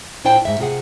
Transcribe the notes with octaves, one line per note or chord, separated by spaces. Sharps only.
A#2 D4 E4 C5 G5 A5
G#2 E5
C3 F4 G#4 F#5